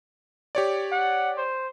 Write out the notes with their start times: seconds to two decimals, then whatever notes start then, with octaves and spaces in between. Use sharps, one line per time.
0.55 G4 C#5 D5
0.92 F#5
1.37 C5